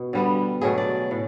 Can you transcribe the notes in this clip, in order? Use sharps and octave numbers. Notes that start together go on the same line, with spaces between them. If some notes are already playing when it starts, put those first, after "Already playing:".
Already playing: B2
D3 G3 B3
B2 F#3 A3 G#4
D5
A2